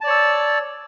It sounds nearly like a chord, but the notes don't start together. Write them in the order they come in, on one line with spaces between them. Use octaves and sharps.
A5 D5 C#5 E6